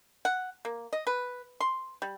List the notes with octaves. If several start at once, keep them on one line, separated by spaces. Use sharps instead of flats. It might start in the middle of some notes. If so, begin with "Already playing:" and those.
F#5
A#3
D#5
B4
C6
G3